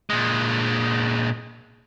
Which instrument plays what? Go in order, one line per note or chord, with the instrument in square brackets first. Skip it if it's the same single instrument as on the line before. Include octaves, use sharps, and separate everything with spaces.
[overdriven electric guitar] A#2 G#3